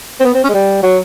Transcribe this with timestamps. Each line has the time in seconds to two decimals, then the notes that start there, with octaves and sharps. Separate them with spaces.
0.20 C4
0.25 B3
0.34 C4
0.44 C#4
0.49 G#3
0.54 G3
0.83 F#3